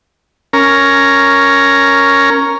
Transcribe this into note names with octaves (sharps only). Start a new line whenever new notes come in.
C#4 A#4